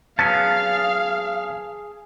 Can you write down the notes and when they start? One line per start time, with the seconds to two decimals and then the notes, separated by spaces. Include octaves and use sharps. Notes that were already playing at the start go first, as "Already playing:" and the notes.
0.19 F#3 B3 C#4 G#4 F5 A5